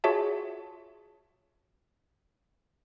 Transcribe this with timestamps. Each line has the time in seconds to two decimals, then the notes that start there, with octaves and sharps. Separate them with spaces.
0.04 F4 F#4 G#4 C#5 E5 A5